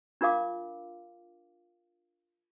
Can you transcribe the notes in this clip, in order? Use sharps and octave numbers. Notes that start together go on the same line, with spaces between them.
D4 F4 A#4 F5 D6